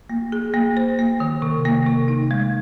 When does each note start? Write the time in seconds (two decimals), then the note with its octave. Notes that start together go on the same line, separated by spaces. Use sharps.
0.10 A#3
0.32 G#4
0.54 A#3
0.77 C5
0.99 A#3
1.20 D#3
1.42 C3
1.65 A#3
1.86 C3
2.08 D#4
2.31 G#3